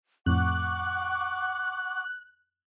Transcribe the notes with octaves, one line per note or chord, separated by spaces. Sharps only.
F2 A2 F#5 C#6 D6 F#6